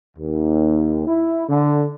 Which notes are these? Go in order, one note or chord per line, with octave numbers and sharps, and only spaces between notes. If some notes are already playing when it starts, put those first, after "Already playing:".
D#2
E4
D3